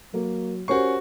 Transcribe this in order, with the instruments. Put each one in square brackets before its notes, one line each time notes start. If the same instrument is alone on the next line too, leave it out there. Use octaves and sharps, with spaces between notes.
[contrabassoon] F#3 [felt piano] A#3
[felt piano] C#4 A#4 C#5 [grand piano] F#4 C#6 [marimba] G4 C5